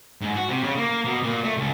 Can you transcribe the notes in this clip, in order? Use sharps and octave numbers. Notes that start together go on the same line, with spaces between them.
G#2
F#4
C3
C#3
A#3
B2
A#2
A3
C#2